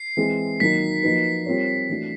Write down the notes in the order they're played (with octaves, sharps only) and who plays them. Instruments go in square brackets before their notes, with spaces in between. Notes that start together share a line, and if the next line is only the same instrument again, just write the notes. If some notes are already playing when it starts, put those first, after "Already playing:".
Already playing: [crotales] C7
[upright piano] E3 G#3 C4
[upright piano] D#3 F#3 A#3 D#4 [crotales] B6
[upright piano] F3 A#3 D#4 F#4 B4
G3 C4 F4 A#4 C#5
E3 A3 D4 F#4